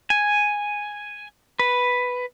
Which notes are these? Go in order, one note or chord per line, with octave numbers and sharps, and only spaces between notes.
G#5
B4